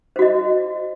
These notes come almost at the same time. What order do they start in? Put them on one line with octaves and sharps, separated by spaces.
C5 F#4 D#5